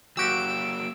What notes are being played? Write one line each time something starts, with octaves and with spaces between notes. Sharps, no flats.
F#3 A#3 F#4 G4 E6 D7